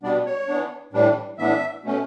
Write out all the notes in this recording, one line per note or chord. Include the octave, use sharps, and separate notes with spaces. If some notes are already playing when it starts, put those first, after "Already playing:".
B2 G3 B3 D4 D5
C#5
E3 B3 D4
A2 E3 G3 D4
A2 E3 B3 D4 E5
B2 A3 C#4